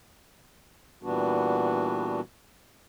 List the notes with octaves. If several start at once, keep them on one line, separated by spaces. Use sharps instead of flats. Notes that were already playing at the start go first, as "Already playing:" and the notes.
A#2 E3 G3 B3 D4 F#4